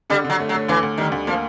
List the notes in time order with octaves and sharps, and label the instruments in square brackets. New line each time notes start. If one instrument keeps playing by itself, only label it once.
[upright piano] D3 [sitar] G3
[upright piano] D3
[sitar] F#3
[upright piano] A3
[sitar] F#3
[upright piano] A3
[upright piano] D2 [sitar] E3
[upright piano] D2
[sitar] D#3 [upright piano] G3
[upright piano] D2
[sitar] F3 [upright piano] A#3